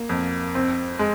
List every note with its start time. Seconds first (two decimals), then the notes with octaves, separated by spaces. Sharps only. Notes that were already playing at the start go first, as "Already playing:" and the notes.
Already playing: A#3
0.09 F2
0.55 C4
0.99 G#3